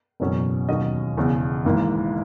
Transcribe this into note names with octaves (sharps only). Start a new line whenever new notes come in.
F#1 E2 B2 F#3 C#4
E1 D#2 D#3 F#3 C#4 D#5
E1 E2 C#3
G#1 G#2 E3 A#3